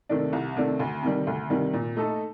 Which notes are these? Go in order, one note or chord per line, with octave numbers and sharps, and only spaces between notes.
C3 D#3 A3 D4
C2
C3 D#3 A3 D4
D2
C3 D#3 G3
D2
C3 D#3 G3
A#2
A3 D#4 A4